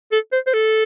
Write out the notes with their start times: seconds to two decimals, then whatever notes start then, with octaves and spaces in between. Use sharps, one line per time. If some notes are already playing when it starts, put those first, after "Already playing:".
0.12 A4
0.33 C5
0.47 C5
0.54 A4